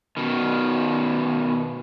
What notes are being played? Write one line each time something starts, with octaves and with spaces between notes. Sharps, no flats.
B2 D#3